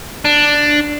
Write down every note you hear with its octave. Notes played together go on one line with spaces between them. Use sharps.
D4